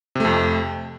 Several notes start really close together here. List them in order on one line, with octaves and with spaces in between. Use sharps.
C3 A3 F2